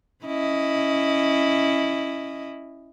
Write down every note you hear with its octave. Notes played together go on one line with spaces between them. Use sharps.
C#4 E4 D#5